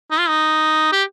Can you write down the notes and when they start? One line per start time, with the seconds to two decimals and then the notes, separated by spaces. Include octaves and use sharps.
0.11 D#4
0.20 F4
0.29 D#4
0.92 G4